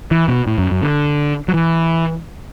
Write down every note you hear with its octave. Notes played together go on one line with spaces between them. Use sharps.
E3
B2
A2
F#2
F#2
D3
F#3
E3